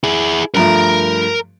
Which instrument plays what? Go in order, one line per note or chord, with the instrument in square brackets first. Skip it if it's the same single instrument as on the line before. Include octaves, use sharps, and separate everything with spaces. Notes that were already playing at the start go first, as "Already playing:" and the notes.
[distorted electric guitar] E4 G#4
[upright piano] G2 F3 A3 [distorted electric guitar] A#4 A#5